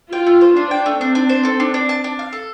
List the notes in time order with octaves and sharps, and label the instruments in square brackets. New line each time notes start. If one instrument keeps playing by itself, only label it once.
[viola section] F4 [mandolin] G5
[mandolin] A3
C5
[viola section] D4 [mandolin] F4
[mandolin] G5
A3
[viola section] C4 [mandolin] D4
[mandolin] D4
C5
A4
D4
D4
A5
D4
F5
A4